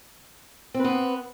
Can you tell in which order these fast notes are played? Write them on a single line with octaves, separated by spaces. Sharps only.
C4 B4 B3